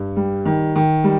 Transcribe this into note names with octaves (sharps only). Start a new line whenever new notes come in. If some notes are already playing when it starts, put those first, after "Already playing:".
Already playing: G2
G3
D#3
D#3
G3